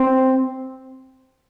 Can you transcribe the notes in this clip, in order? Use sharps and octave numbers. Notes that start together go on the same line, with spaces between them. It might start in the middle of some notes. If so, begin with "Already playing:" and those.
Already playing: C4